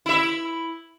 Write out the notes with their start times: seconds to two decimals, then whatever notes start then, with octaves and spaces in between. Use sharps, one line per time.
0.06 E4 E5